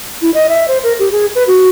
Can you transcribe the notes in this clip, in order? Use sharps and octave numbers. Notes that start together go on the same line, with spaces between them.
E4
D#5
E5
C5
A#4
G4
G#4
B4
F#4